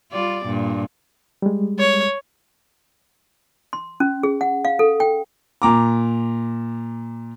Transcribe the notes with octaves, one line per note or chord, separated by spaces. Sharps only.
G3 F4 D5
G2 A#2
G3 G#3
C#5
C6
C#4
G#4
F#5
F5
A4
G5
A#2 A#5 D6